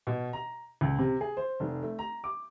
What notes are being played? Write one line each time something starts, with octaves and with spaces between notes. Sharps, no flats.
B2
A#5
C#2
C3
G#4
C5
F1
A3
A#5
D6